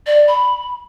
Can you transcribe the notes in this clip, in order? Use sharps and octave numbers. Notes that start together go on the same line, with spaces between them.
D5
B5